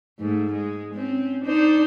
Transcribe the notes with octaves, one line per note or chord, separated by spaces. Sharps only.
G#2 A3
G#3
C4 C#4
D4 D#4 C5